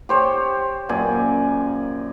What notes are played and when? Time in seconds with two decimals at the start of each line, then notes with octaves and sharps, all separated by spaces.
0.09 G4 C5 C#5
0.89 F#2 A#2 D5 G#5